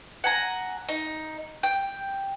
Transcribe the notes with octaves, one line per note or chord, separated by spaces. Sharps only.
F#5 G#5 A#5
D#4
G5